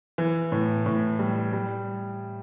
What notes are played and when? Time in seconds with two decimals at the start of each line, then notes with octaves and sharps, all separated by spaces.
0.18 E3
0.52 A2
0.86 A2
1.19 G3
1.53 G3